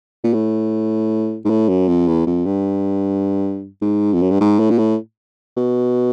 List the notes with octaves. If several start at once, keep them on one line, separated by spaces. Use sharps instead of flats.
A#2
A2
G#2
A2
F#2
F2
E2
F2
G2
G#2
F2
F#2
G2
G#2
A2
A#2
A2
B2